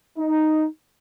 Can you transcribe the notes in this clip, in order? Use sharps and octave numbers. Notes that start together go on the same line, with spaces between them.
D#4